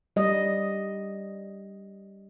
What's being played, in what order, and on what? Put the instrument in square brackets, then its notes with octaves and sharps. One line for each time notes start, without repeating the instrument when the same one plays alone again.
[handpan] G3 D#5